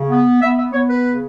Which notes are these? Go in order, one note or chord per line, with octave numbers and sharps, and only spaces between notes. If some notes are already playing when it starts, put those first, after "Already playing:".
Already playing: C#3
B3
B3 E5
E5
B3 C#5
B4
C#3